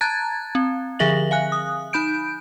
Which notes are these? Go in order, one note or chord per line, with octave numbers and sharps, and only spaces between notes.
A5 A#5 F#6 G#6 A6
C4
D3 F3 G#4 E5 A#6 F#7
F5 G#5 F#6
D#6
D#4 B5 G6 D7